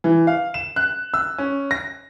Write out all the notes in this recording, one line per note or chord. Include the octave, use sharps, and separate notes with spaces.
E3
F5
E7
F#6
E6
C#4
A#6